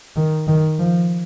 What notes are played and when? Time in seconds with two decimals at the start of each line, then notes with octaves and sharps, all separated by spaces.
0.16 D#3
0.48 D#3
0.79 F3